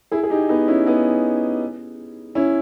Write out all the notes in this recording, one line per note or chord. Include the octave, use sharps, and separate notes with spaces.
E4 G#4
G#4
D#4 G4
B3 D#4
C#4 E4
B3 D#4
C#4 E4